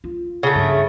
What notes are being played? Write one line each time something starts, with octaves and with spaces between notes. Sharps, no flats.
F4
C#3 A3
G2